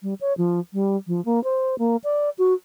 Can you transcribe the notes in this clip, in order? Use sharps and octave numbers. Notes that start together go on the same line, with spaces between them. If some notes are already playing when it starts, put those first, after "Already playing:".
G3
C#5
F3
G3
F3
A#3
C5
A#3
D5
F#4